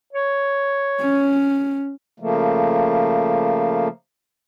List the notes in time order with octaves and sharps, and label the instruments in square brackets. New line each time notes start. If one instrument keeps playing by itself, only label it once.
[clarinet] C#5
[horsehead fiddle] C#4
[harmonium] C#3 F3 A3 A#3